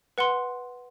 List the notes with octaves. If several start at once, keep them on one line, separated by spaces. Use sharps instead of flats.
B4 F#5 C6